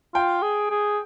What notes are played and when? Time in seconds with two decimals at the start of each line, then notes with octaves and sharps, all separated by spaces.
0.14 F4 G5
0.42 G#4
0.70 G#4